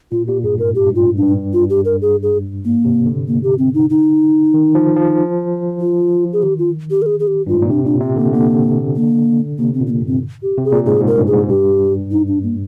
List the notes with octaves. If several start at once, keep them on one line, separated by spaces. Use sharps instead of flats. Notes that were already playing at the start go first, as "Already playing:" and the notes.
A#2 F4
A#2 G4
G2 G#4
G#2 A#4
G4
G2
G#2
F4
G2
D4
G2
F4
G4
A#4
G#4
G#4
G#2 A#3
C3
D3
A#3
G4
C4
D#4
D#4
D#3
F3
F3
F4
G#4
D#3 G4
F4
G4
A#4
G#4
G#4
G4
G2 F4
G#2
A#2
C3 D4
A#2 D4
C3 C4
D3 A#3
D3 A#3
A#3
C3 A#3
C4
A#2
C4
A#3
G2
C4
G4
C3
G#4
A#2
G#2 G#4
G#2
A#4
G2
G#2 G#4
G2 G4
D#4
D4
A#3